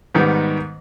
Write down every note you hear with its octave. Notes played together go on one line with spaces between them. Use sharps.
G#2 D#3 G3 B3